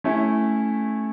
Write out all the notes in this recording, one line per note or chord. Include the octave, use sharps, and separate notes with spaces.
A3 C#4 E4